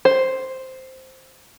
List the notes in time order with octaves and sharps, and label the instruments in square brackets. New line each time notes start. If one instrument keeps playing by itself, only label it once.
[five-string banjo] C5